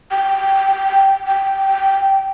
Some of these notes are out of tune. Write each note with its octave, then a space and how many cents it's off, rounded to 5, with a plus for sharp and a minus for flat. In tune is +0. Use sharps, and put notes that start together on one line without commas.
G5 -10
G5 -15